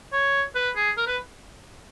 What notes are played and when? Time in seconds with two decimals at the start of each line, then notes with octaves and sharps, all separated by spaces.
0.13 C#5
0.55 B4
0.76 G#4
0.98 A#4
1.07 B4